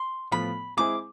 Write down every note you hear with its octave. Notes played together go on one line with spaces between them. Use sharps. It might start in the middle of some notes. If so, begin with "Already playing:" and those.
Already playing: C6
A2 F3 B3 F4 B5
G#3 C4 E4 G#4 D6